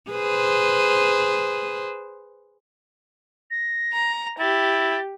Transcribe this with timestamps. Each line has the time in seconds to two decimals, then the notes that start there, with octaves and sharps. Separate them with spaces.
0.11 G#4 B4 C5
3.51 A#6
3.93 A#5
4.39 E4 G4 A6